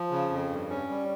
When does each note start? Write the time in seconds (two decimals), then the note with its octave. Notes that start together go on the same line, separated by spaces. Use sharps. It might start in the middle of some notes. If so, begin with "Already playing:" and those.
Already playing: F3
0.11 C#3
0.30 F2
0.50 G2
0.70 C#4
0.89 G3